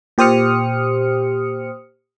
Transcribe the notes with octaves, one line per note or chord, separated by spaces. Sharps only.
A#2 G4 C5 D#6 F6 C#7